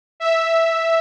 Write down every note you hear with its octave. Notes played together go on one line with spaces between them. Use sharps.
E5